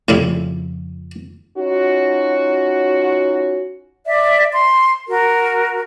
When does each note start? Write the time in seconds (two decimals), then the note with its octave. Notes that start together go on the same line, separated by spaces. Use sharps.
0.08 F2 A2 C#3 F3 G3 E4
1.57 C#4 D#4 F4 F#4
4.06 D5 E5
4.52 C6
5.08 F#4 A#4